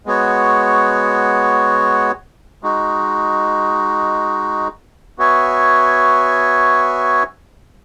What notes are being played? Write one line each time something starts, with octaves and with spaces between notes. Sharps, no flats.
G#3 B3 F#4 C#5
G#3 D#4 F#4
B3 F#4 C#5 E5 G#5